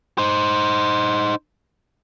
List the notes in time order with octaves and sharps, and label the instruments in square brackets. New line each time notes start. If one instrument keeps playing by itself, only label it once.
[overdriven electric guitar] D#4 C5